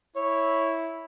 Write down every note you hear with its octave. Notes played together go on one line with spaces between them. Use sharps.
E4 C#5